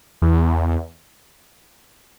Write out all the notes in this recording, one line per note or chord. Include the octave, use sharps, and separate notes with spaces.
E2